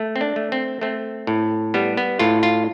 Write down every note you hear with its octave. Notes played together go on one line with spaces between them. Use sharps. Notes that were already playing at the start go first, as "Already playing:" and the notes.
Already playing: A3
C4
D4
A3
C4
A3 C4
A2
G3 B3
B3
A2 F4
F4